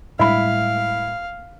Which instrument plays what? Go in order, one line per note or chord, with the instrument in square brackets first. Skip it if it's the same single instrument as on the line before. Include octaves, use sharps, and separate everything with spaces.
[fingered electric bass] A2 G3 G#3 [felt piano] E4 B5 [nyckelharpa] F5